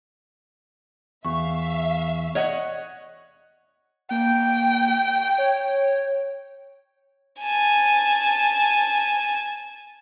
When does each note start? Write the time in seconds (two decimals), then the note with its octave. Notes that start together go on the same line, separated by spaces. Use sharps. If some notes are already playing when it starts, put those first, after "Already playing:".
1.25 E2 E5 F5 C#6
2.35 C#5 D#5 F#5
4.11 A#3 G5
5.38 C#5
7.42 G#5 A5